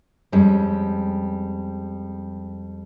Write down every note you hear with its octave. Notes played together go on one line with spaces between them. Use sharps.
F2 G3 G#3 C#4